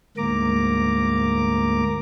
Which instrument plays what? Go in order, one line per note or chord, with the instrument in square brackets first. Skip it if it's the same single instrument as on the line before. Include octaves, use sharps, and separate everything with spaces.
[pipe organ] D2 G#2 A#3 A#5 D6